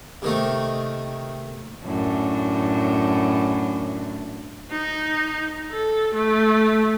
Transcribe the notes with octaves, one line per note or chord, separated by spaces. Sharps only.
C3 D#3 A3
F#2 A2 D4
D#4
A4
A3